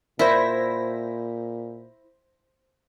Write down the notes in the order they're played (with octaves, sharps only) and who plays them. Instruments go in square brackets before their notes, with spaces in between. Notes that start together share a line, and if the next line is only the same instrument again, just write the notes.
[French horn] A#2 [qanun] E4 [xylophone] A#4 D5 E5 [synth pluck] C5 A#6 B6